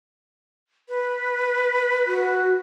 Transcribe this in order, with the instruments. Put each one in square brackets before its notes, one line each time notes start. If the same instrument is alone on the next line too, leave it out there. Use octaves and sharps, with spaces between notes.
[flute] B4
[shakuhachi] F#4